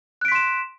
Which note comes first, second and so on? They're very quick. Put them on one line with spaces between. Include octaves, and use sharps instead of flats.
F#6 D7 B6 C6 E7